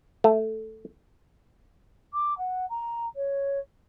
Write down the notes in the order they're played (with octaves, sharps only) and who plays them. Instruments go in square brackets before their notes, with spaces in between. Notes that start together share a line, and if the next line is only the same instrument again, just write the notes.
[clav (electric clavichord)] A3
[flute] D6
F#5
A#5
C#5